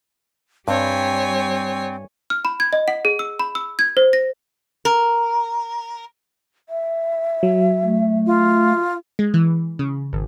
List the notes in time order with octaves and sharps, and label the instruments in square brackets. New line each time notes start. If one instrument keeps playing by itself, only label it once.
[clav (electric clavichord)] G2 [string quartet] G3 C#5 G#5 [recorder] C4
[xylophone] F6
B5
G#6
D#5
F#5
G#4
E6
B5
E6
G#6
C5
A#6
[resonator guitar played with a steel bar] A#4
[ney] E5
[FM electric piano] F#3
[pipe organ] A3
[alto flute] F4
[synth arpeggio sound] G#3
E3
C#3
G#1